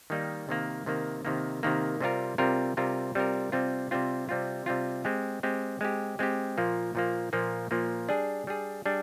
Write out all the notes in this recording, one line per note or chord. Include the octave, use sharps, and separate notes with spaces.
D#3 G3 A#3 D#4
C3 D#3 A#3
C3 D#3 A#3
C3 D#3 A#3
C3 D#3 A#3
C3 G3 C4 F4 A#4
C3 G3 C4 F4 A#4
C3 G3 C4 F4 A#4
C3 G3 C4 F4 A#4
C3 G3 C4 F4
C3 G3 C4 F4
C3 G3 C4 F4
C3 G3 C4 F4
G#3 C4 G4
G#3 C4 G4
G#3 C4 G4
G#3 C4 G4
A#2 F3 A#3
A#2 F3 A#3
A#2 F3 A#3
A#2 F3 A#3
G3 D4 G#4
G3 D4 G#4
G3 D4 G#4